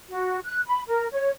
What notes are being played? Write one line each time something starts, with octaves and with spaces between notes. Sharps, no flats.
F#4
F#6
B5
A#4
C#5